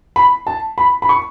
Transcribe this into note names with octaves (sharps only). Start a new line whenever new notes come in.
B5
A5
B5
B5
C#6